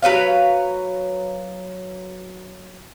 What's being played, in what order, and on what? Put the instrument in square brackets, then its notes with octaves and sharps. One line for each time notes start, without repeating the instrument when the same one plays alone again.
[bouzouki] F#3 B4 C#5 F5